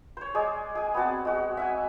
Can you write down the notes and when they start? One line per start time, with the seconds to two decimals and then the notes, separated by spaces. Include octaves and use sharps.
0.17 C5 C#5
0.34 G#3 G#4 D5
0.75 G#4 G#5
0.94 B3 C4 F#4 A5
1.25 G#3 F#4
1.57 E5 F#5 G#5